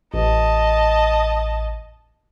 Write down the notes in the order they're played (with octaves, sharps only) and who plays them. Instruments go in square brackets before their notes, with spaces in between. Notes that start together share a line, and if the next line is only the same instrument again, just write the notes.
[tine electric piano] A1 [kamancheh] D#5 A5